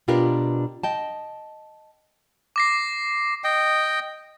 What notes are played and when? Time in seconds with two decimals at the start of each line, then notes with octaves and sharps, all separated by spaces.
0.08 B2 D4 F4 G4 A#4 B4
0.83 D#5 G5 A5
2.56 D6 A#6 C7
3.44 D#5 G5